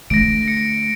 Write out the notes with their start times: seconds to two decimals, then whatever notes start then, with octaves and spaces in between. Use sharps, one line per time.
0.10 D3 A3 A#6 D7
0.48 C#7